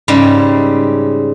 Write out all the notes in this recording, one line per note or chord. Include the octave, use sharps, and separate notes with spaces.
G#2 C#3 G3